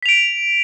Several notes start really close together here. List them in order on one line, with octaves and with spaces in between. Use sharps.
B6 F7 D7